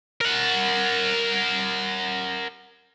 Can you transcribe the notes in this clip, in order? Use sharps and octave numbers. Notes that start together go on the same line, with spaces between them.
A#4 F#5